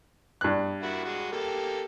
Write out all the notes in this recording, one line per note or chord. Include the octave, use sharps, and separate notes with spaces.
G2 F#6
A#3 E4 F#4
G#3 F#4
A#3 G4 A4